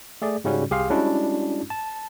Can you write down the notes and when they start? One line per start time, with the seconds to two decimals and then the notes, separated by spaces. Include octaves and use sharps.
0.22 A3 G#4 D5
0.44 G#2 C#3 G3 C#4 F#4
0.71 C2 G4 G#4 F5 C6
0.90 G3 G#3 C#4 D4 E4 F#4
1.70 A5